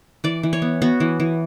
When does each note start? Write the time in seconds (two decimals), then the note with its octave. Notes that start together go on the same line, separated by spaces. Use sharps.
0.24 E3 D5
0.43 E3
0.53 C#5
0.62 B3
0.82 B3 F#4
1.00 E3
1.20 E3